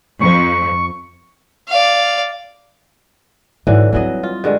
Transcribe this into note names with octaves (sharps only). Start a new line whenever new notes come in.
F2 C#6
D5 F5
G#2 D3 E3 F#3
E3 F#3 G3 C4 D#5
F4
G2 D3 G#3